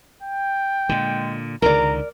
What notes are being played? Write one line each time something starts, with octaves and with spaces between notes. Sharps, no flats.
G5
A#2 D3 G#3
C#2 D3 D#3 A#4 D5 A#5